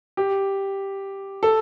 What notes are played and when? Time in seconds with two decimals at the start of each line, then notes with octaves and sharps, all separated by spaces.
0.17 G4
1.43 A4